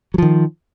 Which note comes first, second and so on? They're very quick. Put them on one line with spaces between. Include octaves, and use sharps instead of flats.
F#3 F3 D#3